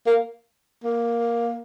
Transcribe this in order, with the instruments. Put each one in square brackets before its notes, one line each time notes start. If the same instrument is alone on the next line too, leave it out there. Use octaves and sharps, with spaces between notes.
[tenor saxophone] A#3
A#3